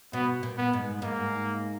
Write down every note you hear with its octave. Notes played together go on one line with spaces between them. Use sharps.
B2 B3
A#2
B3
G#2
G#2 A#3